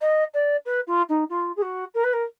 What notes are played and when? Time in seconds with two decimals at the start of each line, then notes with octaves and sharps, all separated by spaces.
0.01 D#5
0.34 D5
0.66 B4
0.87 F4
1.09 D#4
1.30 F4
1.56 G#4
1.62 F#4
1.95 A#4
2.04 B4
2.13 A#4